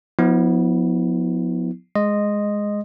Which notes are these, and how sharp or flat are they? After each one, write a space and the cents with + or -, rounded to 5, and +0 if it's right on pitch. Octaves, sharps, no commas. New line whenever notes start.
F3 +35 B3 +0 E4 -30
G#3 +0 D#5 -10 C6 +0